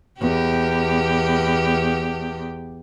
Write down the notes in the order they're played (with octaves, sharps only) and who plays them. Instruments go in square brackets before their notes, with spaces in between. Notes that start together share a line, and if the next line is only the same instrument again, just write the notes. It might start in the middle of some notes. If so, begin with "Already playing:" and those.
[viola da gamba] E2 G4